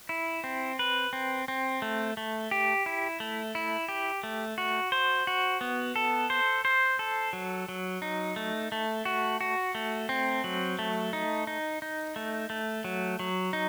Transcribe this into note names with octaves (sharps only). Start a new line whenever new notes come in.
E4
C4
B4
C4
C4
A3
A3
G4
E4
A3
E4
G4
A3
F#4
C5
F#4
B3
A4
C5
C5
A4
F#3
F#3
D#4
A3
A3
F#4
F#4
A3
C4
F#3
A3
D#4
D#4
D#4
A3
A3
F#3
F#3
D#4